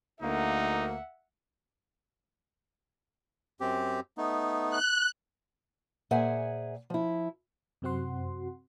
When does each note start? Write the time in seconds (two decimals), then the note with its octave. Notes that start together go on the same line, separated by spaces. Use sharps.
0.22 D2 A#3 D#4 E5 F#5
3.61 F#2 C4 G4
4.18 A3 B3 D#4
4.70 F#6
6.11 A#2 G#4 C5 E5 F#5 G#5
6.90 F3 E4
7.82 F#2 C3 C4 F#4 F#5 C6